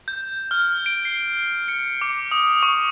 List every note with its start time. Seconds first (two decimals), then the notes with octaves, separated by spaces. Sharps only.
0.08 G6
0.51 F6
0.86 D7
1.05 C7
1.68 C#7
2.01 D6
2.32 D#6
2.63 C#6